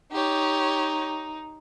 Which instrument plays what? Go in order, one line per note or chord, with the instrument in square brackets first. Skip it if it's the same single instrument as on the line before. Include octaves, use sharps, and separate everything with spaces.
[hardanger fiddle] D#4 [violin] G4 C#5